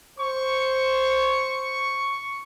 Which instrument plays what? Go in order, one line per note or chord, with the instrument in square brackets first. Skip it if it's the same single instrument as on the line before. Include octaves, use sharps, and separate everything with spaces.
[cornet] C5 [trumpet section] C#6